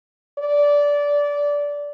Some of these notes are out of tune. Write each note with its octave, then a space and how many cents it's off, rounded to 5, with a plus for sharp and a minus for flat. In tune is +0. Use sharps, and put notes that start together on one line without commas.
D5 -15